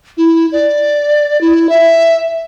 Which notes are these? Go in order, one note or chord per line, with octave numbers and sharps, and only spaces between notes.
E4
D5
E4
E5